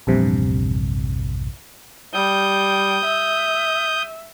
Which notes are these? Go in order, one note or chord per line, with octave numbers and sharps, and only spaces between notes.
A#1 E2 G2 C3
G3 D#6 G6
E5